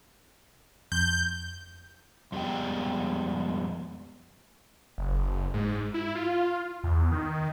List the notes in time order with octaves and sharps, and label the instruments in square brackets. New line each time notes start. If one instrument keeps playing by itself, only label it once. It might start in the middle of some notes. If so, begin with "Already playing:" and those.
[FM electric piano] F2 [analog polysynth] G6
[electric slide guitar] F2 G3 G#3 B3 G5
[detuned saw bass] F#1
G#2
E4
F4
E2
D#3